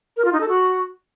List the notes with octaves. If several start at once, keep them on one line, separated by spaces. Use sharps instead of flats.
A#4
F4
D#4
A4
F#4